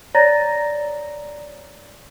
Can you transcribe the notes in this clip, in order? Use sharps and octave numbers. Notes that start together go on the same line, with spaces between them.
C#5 D5 A#5 A6 A#6